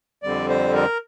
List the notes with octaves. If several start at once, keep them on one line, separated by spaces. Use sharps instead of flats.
F2 D3 G3 C4 D5
C5
A#4